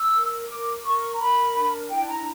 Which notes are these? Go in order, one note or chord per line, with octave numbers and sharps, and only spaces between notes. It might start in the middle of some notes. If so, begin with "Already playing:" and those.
Already playing: E6
A#4
A#4 D6
A#4 C#6
A#5
A#4 B5
D4
E4 G5
A#5